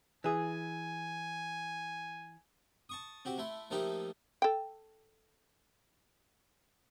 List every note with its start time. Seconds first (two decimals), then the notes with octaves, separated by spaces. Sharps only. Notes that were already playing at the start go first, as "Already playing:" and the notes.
0.24 E3 G#4 G#5
2.89 A5 C#6 D#6
3.25 C4 F#4 G4
3.38 A3 E4 C6
3.71 F3 A3 A#3 D#4 G4
4.42 A4 G5